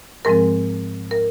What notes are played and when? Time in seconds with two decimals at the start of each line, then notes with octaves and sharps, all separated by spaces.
0.25 G#2 F3 G#3 C4 A#4
1.11 A#4